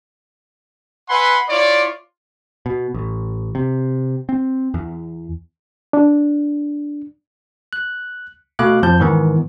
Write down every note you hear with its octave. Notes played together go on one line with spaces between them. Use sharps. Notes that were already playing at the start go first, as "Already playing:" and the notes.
B4 E5 F#5 G#5 B5 C6
E4 F4 C#5 D5
B2
A1
C3
C4
E2
D4
F#6
B2 A3 F5 D6 F#6
F2 F3 A5 G6
G#2 D#3 E3 B3